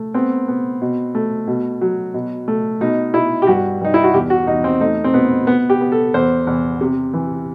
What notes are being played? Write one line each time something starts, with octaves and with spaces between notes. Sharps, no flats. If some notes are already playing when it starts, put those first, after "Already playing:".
Already playing: A3
B3 C4
B3
B2
A3
B2
F#3
B2
A3
B2 D#4
B2 E4
G4
G2 F#4
G2 D#4
E4
F#4
E2 G4
F#4
E2 D#4
C4
A3 D#4
C4
B2 B3
B3
G4
B3
A4
E2 C5
E2
C3
E3